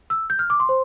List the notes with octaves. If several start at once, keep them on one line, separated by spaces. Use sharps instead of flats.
E6
G6
F6
D6
C6
C5